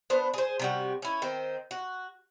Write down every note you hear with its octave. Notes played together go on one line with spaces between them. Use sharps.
B3 D4 C5
G#4 C5
C3 G3 F#4
C#4 E4
D#3 C4
F#4